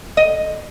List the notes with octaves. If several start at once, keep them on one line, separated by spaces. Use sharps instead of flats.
D#5